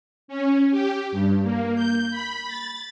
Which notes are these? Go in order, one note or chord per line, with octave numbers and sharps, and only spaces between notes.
C#4
G4
G2
A#3
G6
B5
A6